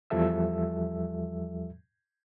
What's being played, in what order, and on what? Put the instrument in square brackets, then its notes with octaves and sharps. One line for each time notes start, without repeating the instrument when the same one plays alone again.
[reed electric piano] E2 F3 G3 A4 E5 E6